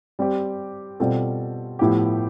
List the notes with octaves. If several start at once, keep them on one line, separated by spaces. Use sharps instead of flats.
G3 C4 G4
B2 G3 C4 F4 A4
A2 F3 B3 E4 G4